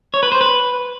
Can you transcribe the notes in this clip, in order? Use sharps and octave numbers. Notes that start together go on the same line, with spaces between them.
C#5
B4
C5
B4